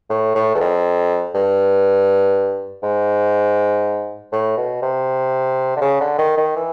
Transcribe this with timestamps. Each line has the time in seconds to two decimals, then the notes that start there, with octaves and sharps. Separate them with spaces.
0.10 A2
0.35 A2
0.55 E2
0.60 F2
1.34 G2
2.83 G#2
4.33 A2
4.57 B2
4.82 C3
5.76 D3
5.81 C#3
6.00 D3
6.18 D#3
6.37 D#3
6.56 E3